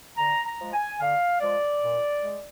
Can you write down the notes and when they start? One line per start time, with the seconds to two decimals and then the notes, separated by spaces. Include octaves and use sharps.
0.18 D3 A#5
0.45 A#5
0.59 F3 G#3
0.72 G#5
0.99 D3 F5
1.40 F3 G#3 D5
1.82 A#2
2.22 G#3